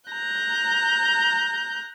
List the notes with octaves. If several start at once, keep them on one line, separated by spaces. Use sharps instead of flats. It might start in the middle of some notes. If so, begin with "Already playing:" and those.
A#5 F#6 G6